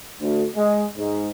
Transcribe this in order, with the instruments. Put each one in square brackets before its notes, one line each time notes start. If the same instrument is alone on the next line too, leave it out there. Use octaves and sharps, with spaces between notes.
[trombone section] D2
G#3
G#2